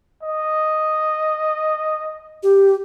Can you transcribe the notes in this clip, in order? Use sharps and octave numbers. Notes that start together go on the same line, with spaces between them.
D#5
G4